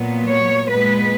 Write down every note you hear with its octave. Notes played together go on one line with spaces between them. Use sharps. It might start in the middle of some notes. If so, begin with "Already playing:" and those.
Already playing: A#2 F#3 B3
C#5
A#2 G#3 B3 B4